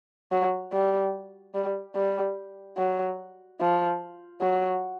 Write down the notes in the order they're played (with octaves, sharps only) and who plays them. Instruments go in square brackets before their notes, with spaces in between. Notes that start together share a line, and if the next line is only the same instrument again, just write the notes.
[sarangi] F#3
G3
G3
G3
F#3
F3
F#3